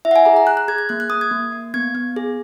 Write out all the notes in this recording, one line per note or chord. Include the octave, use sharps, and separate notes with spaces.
E4 E5
F#5
G#5
G#4 A#5
A#5
G#4 F#6
F#6
G#4 G#6
G#6
A#3 F#6
F#6
A#3 D#6
G#6
A#3
A#3
B3 G#6
B3
G#4